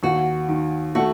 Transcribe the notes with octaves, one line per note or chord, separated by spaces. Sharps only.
D#2 F#4
D#3
A3 F#4